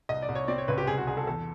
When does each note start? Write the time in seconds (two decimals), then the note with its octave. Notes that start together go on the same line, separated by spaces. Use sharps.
0.09 C2 D#5
0.22 D5
0.29 C2
0.35 C#5
0.48 C4 D5
0.58 C#5
0.68 C#2 B4
0.78 G4
0.87 C2 G#4
0.97 F#4
1.07 C2 G#4
1.17 A4
1.27 E2 A4